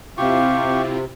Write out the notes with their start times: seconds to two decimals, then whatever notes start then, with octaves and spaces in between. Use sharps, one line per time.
0.18 C3 C4 E4 F4 G4 F5 C#6